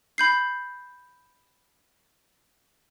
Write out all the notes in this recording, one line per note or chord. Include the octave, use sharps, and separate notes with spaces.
B5 G6 C7